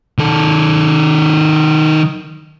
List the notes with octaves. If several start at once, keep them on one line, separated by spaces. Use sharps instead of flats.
D#3 A4